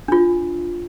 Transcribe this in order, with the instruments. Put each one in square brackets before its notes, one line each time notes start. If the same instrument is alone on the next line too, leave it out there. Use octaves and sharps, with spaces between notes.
[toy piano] D4 F4